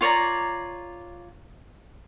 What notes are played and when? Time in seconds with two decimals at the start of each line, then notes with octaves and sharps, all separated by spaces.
0.01 F4 C#5 D5 A#5